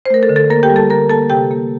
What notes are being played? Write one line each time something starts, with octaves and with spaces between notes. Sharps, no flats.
C5
A3 A#4
A4
D3
A4
A#3 A#4
G4 G5
G3
A4 A5
D3 A#4 A#5
A#3 A4 A5
C3 G4 G5
A#3